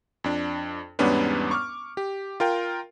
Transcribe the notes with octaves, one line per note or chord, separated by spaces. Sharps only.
F2 D4
E2 G#2 G3 B3 C#4 D4
C#6 D6 F6
G4
F4 A#4 G5